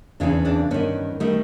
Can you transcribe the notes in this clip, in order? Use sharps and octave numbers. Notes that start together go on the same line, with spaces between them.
E2 C#3 E3 C4 D4
C4 D4
G2 D#3 B3 C#4
D#3 G3 A3